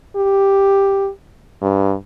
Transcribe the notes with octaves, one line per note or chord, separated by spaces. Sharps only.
G4
G2